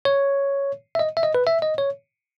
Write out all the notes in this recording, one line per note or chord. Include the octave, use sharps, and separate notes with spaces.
C#5
E5
D#5
E5
D#5
B4
E5
D#5
C#5